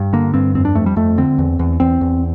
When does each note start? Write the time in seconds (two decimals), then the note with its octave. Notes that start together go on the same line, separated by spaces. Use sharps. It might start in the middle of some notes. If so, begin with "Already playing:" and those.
Already playing: G2
0.13 D3 A#3
0.34 G2 C4
0.55 F2 C4
0.65 D4
0.75 F2 A3
0.86 G3
0.96 F2 A3
1.18 D3 C4
1.39 E2
1.59 E2
1.80 E2 C4
2.01 E2